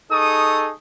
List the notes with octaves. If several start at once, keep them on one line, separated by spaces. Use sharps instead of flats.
D#4 G#4 A4 C#6 D#6